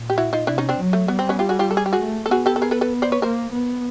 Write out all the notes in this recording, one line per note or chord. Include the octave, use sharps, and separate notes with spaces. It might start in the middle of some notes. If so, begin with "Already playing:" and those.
Already playing: A#2
G4
E4 F#4
D#4 F4
C3 D4 E4
C#4 D#4
C4 D4
F#3
A3
G3 B3
C4
B3 C#4
F4 G4
F#4 G#4
F4 G4
A4
G#4
G4
F#4 G#4
A3
A4
B3 F#4 G#4
G4 A4
A4
G#4 A#4
A4 B4
A4 B4
C5 D5
B4 C#5
A#3 A#4 C5
B3